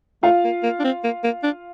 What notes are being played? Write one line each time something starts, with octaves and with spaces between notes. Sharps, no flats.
A3 F4 F5
A#3
A#3
D4
C4
A#3
A#3
D4